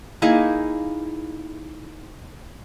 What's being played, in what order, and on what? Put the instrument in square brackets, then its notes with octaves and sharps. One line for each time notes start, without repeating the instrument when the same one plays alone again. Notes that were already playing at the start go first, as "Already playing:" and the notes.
[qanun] A#3 D#4 E4 G#4